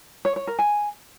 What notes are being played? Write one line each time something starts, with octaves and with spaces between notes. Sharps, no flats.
C#5
C#5
A#4
G#5